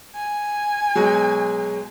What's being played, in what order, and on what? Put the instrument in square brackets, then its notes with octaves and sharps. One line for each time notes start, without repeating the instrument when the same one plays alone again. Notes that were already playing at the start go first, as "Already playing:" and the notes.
[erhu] G#5
[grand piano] B2 F#3 G#3